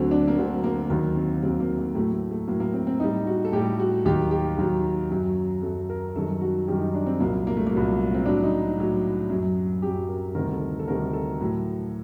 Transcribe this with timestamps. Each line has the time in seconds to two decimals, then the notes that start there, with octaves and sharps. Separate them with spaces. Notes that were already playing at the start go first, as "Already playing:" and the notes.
Already playing: D2 D3 F#3 C4
0.11 D4
0.28 A#3
0.38 D2 D3 F#3 C4
0.64 A#3
0.90 D#2 D#3 F#3 A#3
1.16 C4
1.43 D#2 D#3 F#3 C4
1.60 A#3
1.78 A#3
1.95 A2 F#3 A3
2.12 A3
2.31 A3
2.48 A2 F#3 A#3
2.60 A#3
2.73 C4
2.87 C4
3.00 A2 G3 D#4
3.27 F#4
3.45 A4
3.52 A2 G3 G4
3.79 F#4
4.05 D#2 D#3 F#3 G4
4.31 G4
4.57 D#2 D#3 F#3
5.10 F#2 F#3
5.62 F#2 F#3 A4
5.89 A#4
6.16 F#2 D#3 G3 A4
6.41 F#4
6.68 F#2 D#3 G3 G4
6.80 D#4
6.94 D4
7.06 C4
7.20 C2 A#2 F#3 A#3
7.47 A#3
7.57 A3
7.67 A#3
7.72 C2 A#2 F#3
8.14 C4
8.25 A2 F#3 D4
8.43 D#4
8.78 A2 F#3
9.30 F#2 F#3
9.82 F#2 F#3 G4
10.09 A#4
10.35 D2 C3 D#3 G3 A#4
10.53 A4
10.79 A4
10.87 D2 C3 D#3 G3 A#4
11.13 A4
11.41 A2 F#3